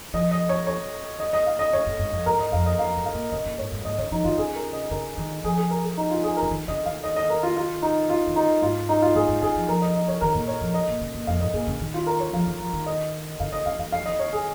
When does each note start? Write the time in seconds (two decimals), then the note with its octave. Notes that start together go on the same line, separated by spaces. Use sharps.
0.14 F3 D#5
0.31 D#5
0.49 C#5
0.67 C#5
1.20 D#5
1.33 D#5
1.46 F5
1.59 D#5
1.73 C#3 C#5
1.87 A#2
1.99 G#2
2.12 F2
2.26 G#2 A#4
2.39 D#5
2.52 F2 F5
2.66 D#5
2.79 F2 F5
2.97 G#2
3.05 F5
3.14 A#2
3.32 C#3 D#5
3.46 A#2
3.58 G#2 C#5
3.72 G#2
3.85 G#2 D#5
3.98 C#3 C#5
4.11 F3 D#4
4.24 D#3 F4
4.38 C#3 G#4
4.55 A#4
4.73 D#5
4.91 C#3 A#4
5.17 D#3
5.44 F3 G#4
5.57 G#4
5.70 A#4
5.84 G#4
5.97 D#4
6.10 F4
6.24 G#4
6.37 A#4
6.42 C#3
6.51 D#3
6.68 C#3 D#5
6.86 D#3 F5
7.03 D#5
7.16 D#5
7.30 A#4
7.43 F4
7.57 F4
7.82 D#4
8.10 F4
8.27 D#3
8.36 D#4
8.62 G#2 F4
8.89 D#4
9.02 F4
9.15 G#2 G#4
9.29 G#2
9.42 C#3 G#4
9.56 F3
9.68 F3 A#4
9.82 D#5
9.95 D#5
10.08 C#5
10.21 D#3 A#4
10.35 A#2
10.48 C#5
10.61 F3
10.74 D#5
10.88 A#2
11.01 C#3
11.14 A#2
11.27 F2 F5
11.41 G#2 D#5
11.54 A#2 G#4
11.67 C#3
11.81 D#3
11.94 F4
12.07 A#4
12.20 C#5
12.33 F3 F5
12.47 D#3
12.60 F3
12.73 D#3
12.86 D#5
13.40 C#3 F5
13.52 C#3 D#5
13.66 C#3 F5
13.79 D#3 F5
13.92 D#3 F5
14.01 F3
14.06 D#3 D#5
14.19 C#5
14.33 G#4